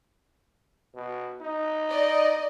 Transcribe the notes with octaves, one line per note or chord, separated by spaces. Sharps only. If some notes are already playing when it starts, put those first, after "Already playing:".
B2
D#4
D5 D#5